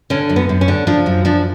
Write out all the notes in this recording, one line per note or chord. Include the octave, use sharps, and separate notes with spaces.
D3 C#4
F#2
B3
F#2
C#4
D3
F3 D4
F#2
F3 D4